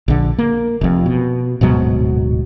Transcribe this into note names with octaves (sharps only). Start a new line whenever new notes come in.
A#1 D3
A#3
F1 F2
B2
D1 G#2 B2 F#3